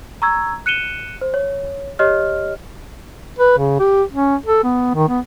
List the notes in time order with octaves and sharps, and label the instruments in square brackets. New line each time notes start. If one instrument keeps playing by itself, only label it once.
[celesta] A#5 C#6 E6 G#6
F#6 C#7 D#7 E7 G7
C5
C#5
G4 C#5 D#5 F6
[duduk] B4
C#3
G4
C#4
A4
B3
D#3
B3